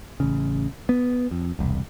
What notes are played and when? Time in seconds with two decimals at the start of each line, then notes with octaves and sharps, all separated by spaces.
0.20 A1 C#3
0.89 B3
1.31 F2
1.59 E1 C2